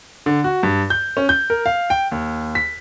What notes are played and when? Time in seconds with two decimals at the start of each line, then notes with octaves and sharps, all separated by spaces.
0.26 D3
0.44 F#4
0.63 G2
0.90 G6
1.17 C#4
1.29 G6
1.50 A#4
1.66 F5
1.90 G5
2.12 D#2
2.55 B6